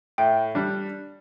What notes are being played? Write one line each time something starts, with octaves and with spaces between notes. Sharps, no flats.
A2 G5
G3 D4